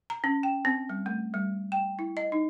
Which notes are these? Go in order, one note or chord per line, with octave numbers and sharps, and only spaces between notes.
A#5
C#4
G5
C4
G3
A3
G3
G5
E4
D#5
D#4